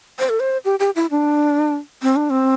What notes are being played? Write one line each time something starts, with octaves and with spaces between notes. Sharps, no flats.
C5
A4
C5
G4
G4
E4
D4
C4
D4
C4